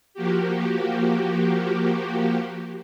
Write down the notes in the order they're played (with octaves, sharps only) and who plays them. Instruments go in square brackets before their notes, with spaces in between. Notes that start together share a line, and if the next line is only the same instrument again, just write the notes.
[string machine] F3 A#3 F#4 G4